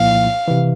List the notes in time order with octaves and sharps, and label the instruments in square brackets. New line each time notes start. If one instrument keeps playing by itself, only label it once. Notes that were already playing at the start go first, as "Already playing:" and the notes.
Already playing: [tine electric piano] C2 A#2 F3 A#3 E4 [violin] F5
[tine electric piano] C3 E3